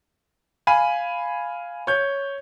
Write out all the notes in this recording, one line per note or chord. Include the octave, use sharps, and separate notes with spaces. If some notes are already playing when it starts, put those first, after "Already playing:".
F5 G#5 B5
C#5 G6